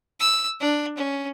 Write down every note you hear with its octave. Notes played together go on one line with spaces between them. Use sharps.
E6
D4
C#4